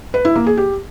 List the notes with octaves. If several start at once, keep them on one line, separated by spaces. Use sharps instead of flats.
B4
E4
A#3
G#4
G4